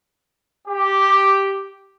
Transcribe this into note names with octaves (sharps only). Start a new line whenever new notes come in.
G4